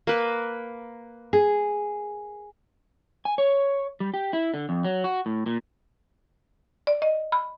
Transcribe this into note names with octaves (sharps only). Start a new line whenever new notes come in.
A#3 B4
G#4
G#5
C#5
G3
G4
E4
D3
F2
F#3
F#4
A2
A#2
D5
D#5
B5